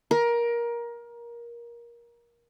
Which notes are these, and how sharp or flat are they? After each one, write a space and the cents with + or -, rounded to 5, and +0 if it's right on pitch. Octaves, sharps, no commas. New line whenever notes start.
A#4 +20